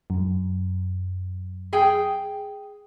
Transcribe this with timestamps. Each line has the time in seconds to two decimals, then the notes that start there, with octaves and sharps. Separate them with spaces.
0.10 F#2
1.73 G#4 G5